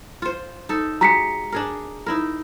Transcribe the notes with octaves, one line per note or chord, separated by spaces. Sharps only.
F4 C5
D#4 A4
G#3 F#4 G4 A#5 B6 C#7
D4 G#4 A#4
D#4 E4 A#4